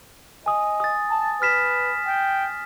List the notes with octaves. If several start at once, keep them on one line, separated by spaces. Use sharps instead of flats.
D#5 G#5 D#6
D#6 A6
A5
B4 F6 B6 E7
G5